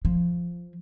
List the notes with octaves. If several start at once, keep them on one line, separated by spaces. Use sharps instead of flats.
F3